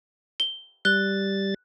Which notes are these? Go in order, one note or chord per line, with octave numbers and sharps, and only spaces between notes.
G7
G3 F#6 A6 G7